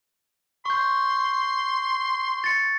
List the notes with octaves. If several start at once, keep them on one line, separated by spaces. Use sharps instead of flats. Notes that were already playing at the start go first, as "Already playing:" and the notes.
C6 C#6 G6
A6 C#7